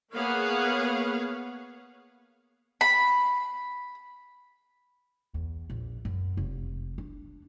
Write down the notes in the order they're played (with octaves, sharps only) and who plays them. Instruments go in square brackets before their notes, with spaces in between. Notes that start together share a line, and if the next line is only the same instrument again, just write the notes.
[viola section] A#3 B3 G#4 C#5 F5 F#5
[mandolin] B5
[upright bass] E2
A#1
F#2
F1
D4